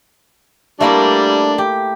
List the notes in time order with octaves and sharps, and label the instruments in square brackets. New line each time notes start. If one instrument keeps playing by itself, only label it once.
[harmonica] G3 D4 [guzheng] A3 A#3 E4
[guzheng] G4